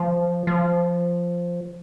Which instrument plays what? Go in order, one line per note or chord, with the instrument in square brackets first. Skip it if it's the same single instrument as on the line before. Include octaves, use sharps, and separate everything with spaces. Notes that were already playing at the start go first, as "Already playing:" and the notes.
Already playing: [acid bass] F3
F3